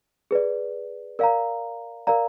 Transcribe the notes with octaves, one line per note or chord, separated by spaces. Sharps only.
G#4 B4 D5
A#4 D5 F5 A#5
A#4 D5 F5 A#5